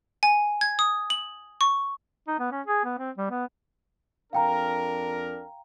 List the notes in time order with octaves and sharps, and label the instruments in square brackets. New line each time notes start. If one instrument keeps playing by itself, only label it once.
[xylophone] G#5
G#6
D#6
F#7
C#6
[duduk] D#4
B3
C#4
G#4
B3
C4
G3
B3
[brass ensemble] F2 D4 A#4 [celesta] F5 G5 A#5